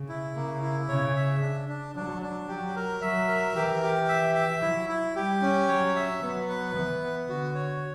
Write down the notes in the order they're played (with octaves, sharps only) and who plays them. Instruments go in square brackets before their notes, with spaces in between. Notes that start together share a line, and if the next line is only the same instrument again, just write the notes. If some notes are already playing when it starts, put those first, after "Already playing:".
Already playing: [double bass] C#3
[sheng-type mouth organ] E4
[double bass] C#3 [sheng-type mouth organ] A#3
[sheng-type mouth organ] E4
[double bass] C#3 [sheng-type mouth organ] C#5
[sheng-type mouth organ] E5
D4
D4
[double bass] F#3 [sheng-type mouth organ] D4
[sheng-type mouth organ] D4
[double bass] F#3 [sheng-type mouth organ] G4
[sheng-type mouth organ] A#4
[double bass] F#3 [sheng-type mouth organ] E5
[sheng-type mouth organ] A#4
[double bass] E3 [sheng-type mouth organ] G4
[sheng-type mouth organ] G4
E5
E5
[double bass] F#3 [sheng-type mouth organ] E4
[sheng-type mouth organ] E4
[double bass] G3 [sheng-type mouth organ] G4
[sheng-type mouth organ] C#4
[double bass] F#3 [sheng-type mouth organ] C#5
[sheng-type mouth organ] E5
[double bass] F#3 [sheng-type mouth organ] B3
[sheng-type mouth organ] B4
[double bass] E3 [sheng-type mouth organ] B3
[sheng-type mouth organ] B3
[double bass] D3 [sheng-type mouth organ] F#4
[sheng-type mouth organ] C#5